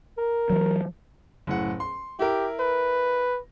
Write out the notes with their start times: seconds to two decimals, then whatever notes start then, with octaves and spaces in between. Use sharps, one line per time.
0.18 A#4
0.50 E3 F#3
1.47 F#1 A2 F#5
1.80 C6
2.19 E4 G4 A#4
2.60 B4